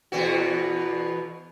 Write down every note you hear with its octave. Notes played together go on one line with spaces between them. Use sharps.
E2 B2 F#4